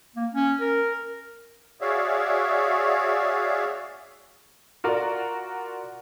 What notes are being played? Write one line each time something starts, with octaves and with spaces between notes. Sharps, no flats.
A#3
C#4
A#4
F#4 G#4 C#5 D5 E5 F5
F4 F#4 A#4 D5